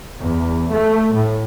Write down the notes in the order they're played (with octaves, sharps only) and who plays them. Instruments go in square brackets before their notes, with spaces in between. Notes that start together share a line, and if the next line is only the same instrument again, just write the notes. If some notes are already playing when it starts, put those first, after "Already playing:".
[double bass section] E2
A3
A2